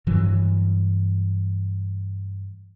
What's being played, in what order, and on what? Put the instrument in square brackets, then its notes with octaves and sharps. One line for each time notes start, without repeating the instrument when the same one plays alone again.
[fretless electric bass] G2 E3 F#3